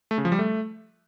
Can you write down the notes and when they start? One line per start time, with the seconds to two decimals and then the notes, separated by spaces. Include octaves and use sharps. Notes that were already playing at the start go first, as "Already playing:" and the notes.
0.11 A3
0.18 C#3
0.25 F3
0.32 G3
0.39 A3